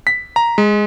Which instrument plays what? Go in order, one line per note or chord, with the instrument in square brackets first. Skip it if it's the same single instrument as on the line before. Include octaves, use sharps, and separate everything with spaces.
[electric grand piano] B6
A#5
G#3